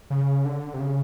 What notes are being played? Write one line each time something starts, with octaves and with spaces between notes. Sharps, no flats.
C#3
D3
C3
C#3